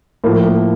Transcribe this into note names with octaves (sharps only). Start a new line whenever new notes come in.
A2 F3 A#3
A#3